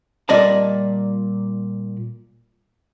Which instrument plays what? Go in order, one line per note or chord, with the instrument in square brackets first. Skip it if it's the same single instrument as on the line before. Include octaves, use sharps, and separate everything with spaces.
[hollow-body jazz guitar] A#2 G3 D5 D#5 A5